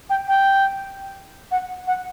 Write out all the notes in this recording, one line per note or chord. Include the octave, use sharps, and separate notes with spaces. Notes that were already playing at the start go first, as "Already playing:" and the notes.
G5
G5
F#5
F#5